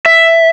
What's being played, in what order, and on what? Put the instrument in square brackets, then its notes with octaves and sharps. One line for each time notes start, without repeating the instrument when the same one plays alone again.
[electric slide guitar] E5